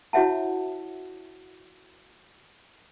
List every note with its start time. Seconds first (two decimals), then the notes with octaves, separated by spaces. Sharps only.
0.13 E4 F#4 C#5 E5 F#5 A5